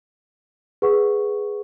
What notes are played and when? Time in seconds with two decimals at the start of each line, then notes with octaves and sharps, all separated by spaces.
0.82 G#4 B4 F#5 C#6